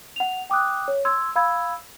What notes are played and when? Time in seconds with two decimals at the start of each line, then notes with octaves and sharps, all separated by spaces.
0.16 F#5 F7
0.50 G5 D6 D#6 F#6
0.88 C#5
1.05 C6 E6 G#6
1.36 F5 B5 E6 G#6